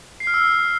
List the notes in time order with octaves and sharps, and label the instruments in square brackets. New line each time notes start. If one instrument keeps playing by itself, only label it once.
[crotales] C7
F6
E6